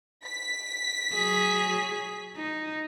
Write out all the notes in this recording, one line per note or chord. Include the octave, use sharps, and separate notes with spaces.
B6
F#3 G#4
D#4